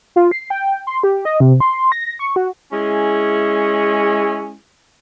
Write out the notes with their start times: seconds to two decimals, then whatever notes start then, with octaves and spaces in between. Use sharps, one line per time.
0.16 F4
0.31 C7
0.50 G5
0.87 C6
1.03 G4
1.25 D#5
1.40 C3
1.60 C6
1.92 A#6
2.19 C#6
2.36 F#4
2.72 G#3 C#4 E4 G#4